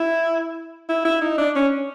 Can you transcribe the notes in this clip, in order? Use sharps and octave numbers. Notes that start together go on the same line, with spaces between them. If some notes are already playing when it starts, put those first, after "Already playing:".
Already playing: E4
E4
E4
D#4
D4
C#4